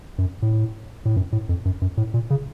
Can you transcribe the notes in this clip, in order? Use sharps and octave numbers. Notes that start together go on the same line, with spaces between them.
F#2
A2
A2
F#2
A2
F2
F#2
F#2
A2
A#2
C#3